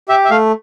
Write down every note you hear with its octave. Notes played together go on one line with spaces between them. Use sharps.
G4 E5
E5
A3 F5